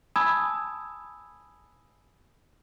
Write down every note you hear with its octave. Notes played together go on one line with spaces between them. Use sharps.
G#5 A5 B5 D#6 E6 G#6